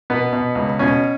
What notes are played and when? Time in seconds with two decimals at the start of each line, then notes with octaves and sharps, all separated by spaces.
0.10 B2 B3
0.33 B2
0.55 C#2
0.79 B2 C#4